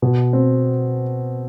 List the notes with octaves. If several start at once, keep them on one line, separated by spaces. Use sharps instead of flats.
B2
C4